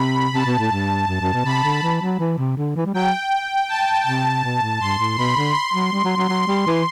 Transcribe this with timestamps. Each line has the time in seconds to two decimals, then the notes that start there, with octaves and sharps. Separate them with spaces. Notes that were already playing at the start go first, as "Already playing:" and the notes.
Already playing: C3 B5
0.34 C3 A5
0.46 B2
0.59 A2
0.71 G2
1.08 F#2
1.21 F#2
1.33 B2
1.45 C3 B5
1.64 D3
1.83 E3
2.02 F#3
2.19 E3
2.38 C3
2.57 D3
2.76 E3
2.85 G3
2.94 F#3 G5
3.69 A5
4.06 C3 A5
4.44 B2
4.62 A2
4.81 G2 C6
4.99 A2
5.17 B2 B5
5.37 D3
5.55 C6
5.74 F#3
5.92 G3
6.04 F#3
6.16 F#3
6.29 F#3 C6
6.47 G3
6.66 E3